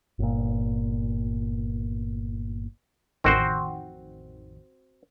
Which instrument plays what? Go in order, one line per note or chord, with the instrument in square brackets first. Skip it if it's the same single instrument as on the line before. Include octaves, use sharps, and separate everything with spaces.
[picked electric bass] G1 A#2
[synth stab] A1 F2 D#3 [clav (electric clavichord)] C4 F#4 C5